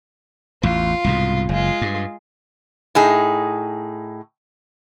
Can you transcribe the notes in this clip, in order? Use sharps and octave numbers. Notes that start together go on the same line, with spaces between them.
A1 E2 F4
C2 G#2 B2
F#1 G#3 F4
G2
A2 D#4 G#4